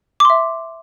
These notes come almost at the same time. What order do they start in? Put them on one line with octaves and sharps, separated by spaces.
D6 C6 E5